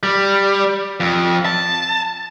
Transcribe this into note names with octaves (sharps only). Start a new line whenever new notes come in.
G3
F2
A5